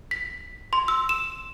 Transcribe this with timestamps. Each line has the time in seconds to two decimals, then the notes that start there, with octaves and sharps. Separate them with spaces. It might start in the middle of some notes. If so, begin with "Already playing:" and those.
0.11 B6
0.73 C6
0.88 E6
1.09 E7